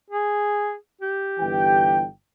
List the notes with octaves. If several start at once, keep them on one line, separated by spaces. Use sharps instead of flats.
G#4
G4
G1 E3 G5